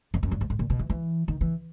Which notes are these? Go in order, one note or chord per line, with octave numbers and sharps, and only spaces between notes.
F2
F#2
G2
G#2
A2
A#2
B2
E3
E3
D#3
E3